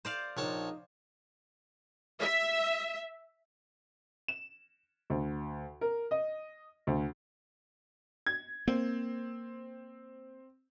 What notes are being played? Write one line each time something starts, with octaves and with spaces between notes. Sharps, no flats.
C5 D5 F5
A#1 D#4 C#5 A5
E5
E7
D2
A#4
D#5
D2
G#6
A#3 C4